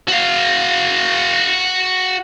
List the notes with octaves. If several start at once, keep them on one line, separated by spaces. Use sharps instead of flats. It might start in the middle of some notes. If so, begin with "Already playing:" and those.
F#4 F5